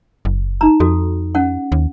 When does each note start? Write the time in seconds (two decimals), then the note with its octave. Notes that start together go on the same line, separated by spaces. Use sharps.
0.25 F#1
0.61 D#4 A#5
0.80 F2 F#4 A4
1.35 C#4 F#5
1.72 D#2